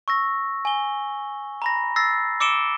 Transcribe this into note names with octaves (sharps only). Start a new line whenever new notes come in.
C#6 E6 A#6
G#5 G7
A#5 B5 A#6
E6 A6 A#6 C7
D6 E6 C#7 D7 E7 G7